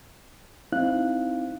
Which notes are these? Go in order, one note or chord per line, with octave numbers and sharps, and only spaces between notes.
C4 D#4 E4 F5 F#6